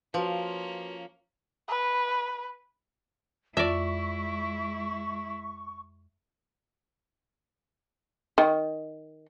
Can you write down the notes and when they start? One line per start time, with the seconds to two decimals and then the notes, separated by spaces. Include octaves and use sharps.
0.14 F3 A#3 C#4 F4 F#4 B4
1.68 B4
3.57 F2 G#3 E4 F4 D5 E5 C#6 A#6
8.38 D#3